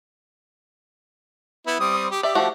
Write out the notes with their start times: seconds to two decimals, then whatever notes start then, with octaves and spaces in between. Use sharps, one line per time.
1.67 B3 E4
1.80 G3 C4 D#6
2.10 G4
2.23 G4 D5 E5
2.35 F3 A3 F#4